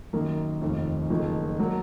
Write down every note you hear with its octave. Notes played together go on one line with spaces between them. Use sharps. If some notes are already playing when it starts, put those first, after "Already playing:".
F#2 D#3 A#3
F1 D#2 D#3
F#1 F2 D#3
F#3 A#3